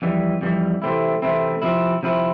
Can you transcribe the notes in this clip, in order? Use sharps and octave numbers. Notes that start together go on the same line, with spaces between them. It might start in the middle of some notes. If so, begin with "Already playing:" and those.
F2 E3 G3
F2 E3 G3
C3 E3 A3 C4 E4
C3 E3 A3 C4 E4
C3 F3 C4 E4
C3 F3 C4 E4